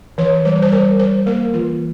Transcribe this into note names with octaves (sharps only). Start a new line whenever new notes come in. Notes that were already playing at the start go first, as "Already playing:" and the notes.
E3 C#5
G3 C5
C5
G3 A#4
G3 C5
A#3 A#4
E3 F4